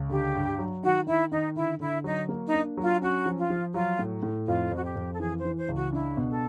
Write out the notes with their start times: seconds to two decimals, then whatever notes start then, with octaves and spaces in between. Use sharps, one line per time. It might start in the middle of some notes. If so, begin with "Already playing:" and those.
Already playing: C#2
0.09 D3 G4
0.35 G2
0.59 F#3
0.83 D#3 F#4
1.07 D#3 E4
1.31 D#3 D#4
1.56 D3 E4
1.80 D3 E4
2.04 F#3 D#4
2.29 A#3
2.46 D#4
2.53 D4
2.77 F#3
2.83 F4
3.02 C#4 F#4
3.26 F3
3.37 F4
3.50 F3
3.74 F#3 F4
3.99 A2
4.23 A2
4.47 F2 F4
4.71 F2 F#4
4.84 G4
4.96 F2
5.12 A4
5.20 E3 G#4
5.38 C5
5.45 E3
5.57 C5
5.68 C#2
5.75 F#4
5.93 D4 E4
6.17 B2
6.30 A4